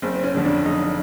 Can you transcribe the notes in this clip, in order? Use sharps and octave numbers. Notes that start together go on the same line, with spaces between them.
F#1 C4
C4
C#4
F2 D3
D4
F#1 D#4